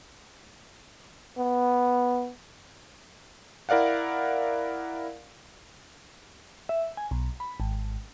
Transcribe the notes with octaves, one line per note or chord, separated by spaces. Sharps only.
B3
E4 A#4 D5 F5 F#5
E5
G#5
B1
B5
G#1